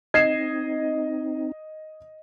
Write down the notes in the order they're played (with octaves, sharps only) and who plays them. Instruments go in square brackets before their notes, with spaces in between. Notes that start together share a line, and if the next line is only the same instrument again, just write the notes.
[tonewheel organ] C4 D#4 [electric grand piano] D#5 [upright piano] G#6 C7 E7